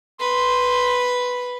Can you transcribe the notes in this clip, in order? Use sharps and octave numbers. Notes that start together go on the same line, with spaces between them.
B4 C6